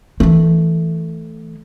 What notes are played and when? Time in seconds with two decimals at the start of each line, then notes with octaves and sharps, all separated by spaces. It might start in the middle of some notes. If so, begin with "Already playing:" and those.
0.20 E3 A3